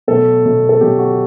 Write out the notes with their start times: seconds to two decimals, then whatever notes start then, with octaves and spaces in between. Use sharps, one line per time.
0.08 B2 F#3 A3 A4
0.44 B2 F#3 A3
0.69 A4
0.81 B2 F#3 A3 G4
0.99 F#4